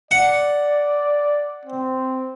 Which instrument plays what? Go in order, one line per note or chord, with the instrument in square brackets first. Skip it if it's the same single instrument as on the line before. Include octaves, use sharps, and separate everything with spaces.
[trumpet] D5 [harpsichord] F#5
[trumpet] C4